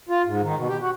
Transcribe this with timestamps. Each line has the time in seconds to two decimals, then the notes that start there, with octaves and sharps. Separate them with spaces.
0.09 F4
0.26 G#2
0.44 D#3
0.56 B2
0.69 G4
0.81 F#4